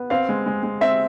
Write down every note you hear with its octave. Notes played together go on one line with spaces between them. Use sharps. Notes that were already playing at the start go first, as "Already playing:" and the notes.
Already playing: B3
C4 F5
G#3
G#3
G#3
C4 E5